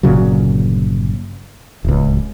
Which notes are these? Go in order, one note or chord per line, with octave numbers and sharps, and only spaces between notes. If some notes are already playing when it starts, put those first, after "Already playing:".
G1 A#2 C#3 F#3
D1 C#2